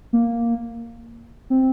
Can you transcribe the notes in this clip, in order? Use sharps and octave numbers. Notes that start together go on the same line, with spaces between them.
A#3
C4